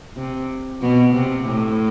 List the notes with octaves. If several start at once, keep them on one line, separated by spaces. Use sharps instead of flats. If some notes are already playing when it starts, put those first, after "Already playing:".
C3
B2
C3
A2